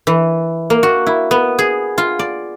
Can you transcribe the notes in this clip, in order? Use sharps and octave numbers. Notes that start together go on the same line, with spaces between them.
E3
A#3
F#4
E4
B3
G#4
F4
D5